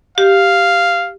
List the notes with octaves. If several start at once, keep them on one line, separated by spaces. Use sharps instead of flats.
G4 F5